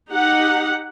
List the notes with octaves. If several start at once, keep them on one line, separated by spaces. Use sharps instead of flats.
D#4 G4 F#5